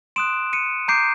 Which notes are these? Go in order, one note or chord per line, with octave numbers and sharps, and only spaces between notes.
C6 D#6 F#6 D7 E7
C#7 D#7
A#5 D6 G6 C7 D7